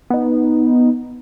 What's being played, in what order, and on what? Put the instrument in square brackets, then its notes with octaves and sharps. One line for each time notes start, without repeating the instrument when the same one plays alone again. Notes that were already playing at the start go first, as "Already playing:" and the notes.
[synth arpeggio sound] B3 D#4